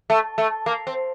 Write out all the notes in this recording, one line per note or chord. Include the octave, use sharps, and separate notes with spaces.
A3
A3
A#3
C4